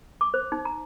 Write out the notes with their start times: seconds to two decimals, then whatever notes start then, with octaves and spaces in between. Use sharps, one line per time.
0.21 D6
0.34 C5
0.52 D#4
0.65 A#5